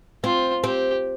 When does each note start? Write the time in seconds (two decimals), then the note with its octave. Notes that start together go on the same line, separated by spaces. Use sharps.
0.24 C4 F4
0.64 C4 G4